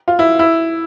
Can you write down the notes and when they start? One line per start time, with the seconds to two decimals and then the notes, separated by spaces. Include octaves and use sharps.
0.08 F4
0.19 E4
0.39 E4